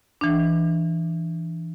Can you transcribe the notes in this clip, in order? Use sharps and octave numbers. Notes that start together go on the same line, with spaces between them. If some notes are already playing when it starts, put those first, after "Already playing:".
E3 D4